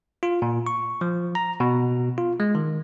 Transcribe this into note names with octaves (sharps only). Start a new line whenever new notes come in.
F4
A#2
C#6
F3
A#5
B2
F4
G#3
D#3